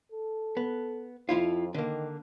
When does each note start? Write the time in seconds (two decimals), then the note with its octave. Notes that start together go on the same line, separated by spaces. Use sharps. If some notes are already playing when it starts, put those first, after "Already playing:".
0.12 A4
0.57 B3
1.29 F2 F3 E4 F4
1.74 D3 D#3 A#3